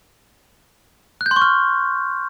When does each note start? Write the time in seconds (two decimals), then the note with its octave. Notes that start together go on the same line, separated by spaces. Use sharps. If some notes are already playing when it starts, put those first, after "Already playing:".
1.21 F#6
1.26 G6
1.31 C6
1.36 C#6
1.42 F6